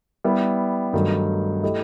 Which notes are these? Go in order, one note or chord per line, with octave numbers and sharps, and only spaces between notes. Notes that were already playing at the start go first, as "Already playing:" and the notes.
G3 B3 E4
G2 D#3 F#3 A3 D#4
A3 E4 G4 D#5